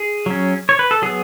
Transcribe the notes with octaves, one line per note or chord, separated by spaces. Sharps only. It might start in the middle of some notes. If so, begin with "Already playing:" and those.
Already playing: G#4
F#3 C#4
C#5
B4
A4
F#3 B3 G#4